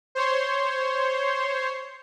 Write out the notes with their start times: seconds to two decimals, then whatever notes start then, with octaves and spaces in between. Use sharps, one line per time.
0.15 C5 C#5 C6